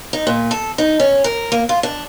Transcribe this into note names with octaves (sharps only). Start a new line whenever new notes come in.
D#4
A#2
A4
D#4
C#4
A#4
A#3
F4
D4